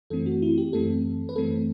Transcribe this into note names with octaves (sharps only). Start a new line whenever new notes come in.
F#2 E3 A3 C4 A4
F#4
E4
G4
F#2 E3 A3 C4 A4
B4
F#2 E3 A3 C4 A4